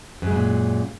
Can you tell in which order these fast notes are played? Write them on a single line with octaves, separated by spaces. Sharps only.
F#2 G#3 C#3 A#2